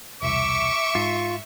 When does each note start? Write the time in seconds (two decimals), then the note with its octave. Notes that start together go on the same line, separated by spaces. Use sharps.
0.23 E1 C2 E5 C#6 D6
0.95 G#2 F4